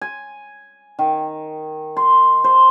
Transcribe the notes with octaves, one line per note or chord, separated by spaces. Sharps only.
G#5
D#3
C6
C5